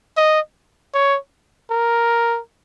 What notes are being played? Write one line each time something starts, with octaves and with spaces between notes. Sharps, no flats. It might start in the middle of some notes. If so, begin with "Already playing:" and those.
D#5
C#5
A#4